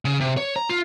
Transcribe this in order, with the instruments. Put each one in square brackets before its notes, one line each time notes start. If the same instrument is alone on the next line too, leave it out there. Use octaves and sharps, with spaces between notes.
[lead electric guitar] C#3
C3
C#5
A#5
F4